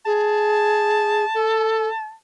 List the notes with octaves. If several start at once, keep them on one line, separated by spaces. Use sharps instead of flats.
G#4 A5
A4